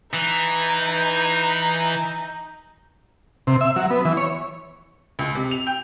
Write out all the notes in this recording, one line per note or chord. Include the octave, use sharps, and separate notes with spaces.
E3 D#4
C3
E5
F#3
B3
E3
C#5
C#2
C3
F7
G5